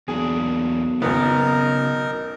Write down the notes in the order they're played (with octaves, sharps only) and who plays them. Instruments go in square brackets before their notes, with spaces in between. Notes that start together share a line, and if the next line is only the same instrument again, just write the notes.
[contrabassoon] B1 [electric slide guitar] E2 A#3 D4 [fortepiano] G#4
[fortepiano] G#1 B3 [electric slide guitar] C#3 [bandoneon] D#4 A#4